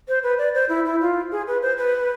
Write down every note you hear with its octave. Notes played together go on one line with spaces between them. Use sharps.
C5
B4
D5
C5
E4
E4
F4
G#4
B4
C5
B4